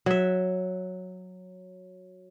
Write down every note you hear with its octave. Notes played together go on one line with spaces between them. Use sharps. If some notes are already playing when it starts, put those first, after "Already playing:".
F#3 E5